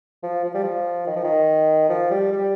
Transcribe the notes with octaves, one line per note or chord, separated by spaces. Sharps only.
F3
F3
G3
F3
D#3
F3
D#3
F3
G3
G3